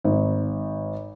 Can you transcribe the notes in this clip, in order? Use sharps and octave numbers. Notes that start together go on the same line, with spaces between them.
G#1